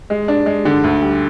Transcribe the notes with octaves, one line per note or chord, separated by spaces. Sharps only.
G#3
D4
G#3
D3
D2
G3